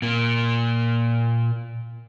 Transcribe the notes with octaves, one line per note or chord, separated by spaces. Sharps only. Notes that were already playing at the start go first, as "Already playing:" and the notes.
A#2 A#3